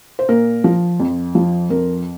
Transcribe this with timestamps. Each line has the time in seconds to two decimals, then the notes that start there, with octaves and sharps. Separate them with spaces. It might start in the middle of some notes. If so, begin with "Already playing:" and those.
0.19 C5
0.29 A#2 A#4
0.64 F3
1.00 F2
1.35 F3
1.70 F2 A#4